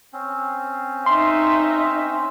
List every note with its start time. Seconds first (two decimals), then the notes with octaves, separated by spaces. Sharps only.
0.13 C4 C#4
1.06 D#4 E5 C6